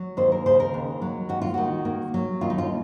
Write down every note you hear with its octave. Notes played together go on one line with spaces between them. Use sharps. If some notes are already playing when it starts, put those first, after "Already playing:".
Already playing: F#3
D#2 C5
A#4
C#3 C5
A#4
D#2
F#3
D#2 F#4
F4
D#3 F#4
A#3
F#3
D#2 F4
D#4
F4